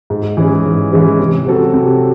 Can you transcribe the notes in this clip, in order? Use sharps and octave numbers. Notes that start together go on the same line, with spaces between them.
G#2
E3 G#3 C#4 G#4
G#2
E3 G#3 C#4 G#4
C3
F#3 C4 F#4 A4
C3